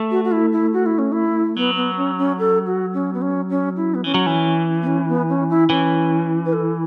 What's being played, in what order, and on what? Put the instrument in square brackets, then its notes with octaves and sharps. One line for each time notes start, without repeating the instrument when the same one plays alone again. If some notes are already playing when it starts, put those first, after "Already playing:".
Already playing: [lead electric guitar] A3
[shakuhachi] F#4
F#4
E4
E4
F#4
E4
C#4
E4
[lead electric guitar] F#3 [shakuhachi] B3
[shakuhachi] B3
C#4
C#4
A4
F#4
C#4
B3
C#4
C#4
E4
B3
[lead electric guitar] E3 [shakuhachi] C#4
[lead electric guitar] F#3
E3
[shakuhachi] B3
C#4
B3
C#4
E4
[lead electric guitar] E3 [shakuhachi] C#4
[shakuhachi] B4
A4